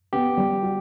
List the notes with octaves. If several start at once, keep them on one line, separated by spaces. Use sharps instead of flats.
B3 G4
G3
F#4